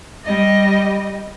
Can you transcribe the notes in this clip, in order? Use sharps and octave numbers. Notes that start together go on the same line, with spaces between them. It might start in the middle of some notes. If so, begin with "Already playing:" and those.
G3 D#5